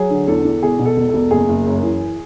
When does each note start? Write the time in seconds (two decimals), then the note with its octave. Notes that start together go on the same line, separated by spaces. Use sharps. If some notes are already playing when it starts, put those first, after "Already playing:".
Already playing: F#3 G#4
0.10 D3
0.27 E2 A4
0.45 E2
0.63 E1 G#4
0.79 B2
0.85 A4
0.97 E1
1.09 E1 A4
1.31 F#1 G#4
1.49 F#1
1.67 F#2
1.83 E3